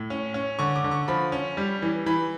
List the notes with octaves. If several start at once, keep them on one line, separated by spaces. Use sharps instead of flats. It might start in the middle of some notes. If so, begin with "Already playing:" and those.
Already playing: A2
C#4
C#4
D3 C#6
D6
D3
C#6
F3 B5
C#4
G3
E3
E3 B5